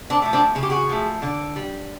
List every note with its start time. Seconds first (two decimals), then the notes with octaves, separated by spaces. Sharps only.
0.10 C4 D4
0.22 F3 A3
0.33 C4 D4
0.55 C#3 G#4
0.63 G4
0.70 F#4 G#4
0.89 F3 A3
1.22 D3
1.56 G3